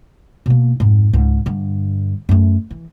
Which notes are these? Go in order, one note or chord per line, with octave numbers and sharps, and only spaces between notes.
B2 A#3
F2 G#2
C#2 G#2
G2 D3
F#2 A3
E3